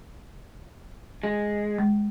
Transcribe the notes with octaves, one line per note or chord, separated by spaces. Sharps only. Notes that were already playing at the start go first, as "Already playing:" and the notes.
G#3
G#3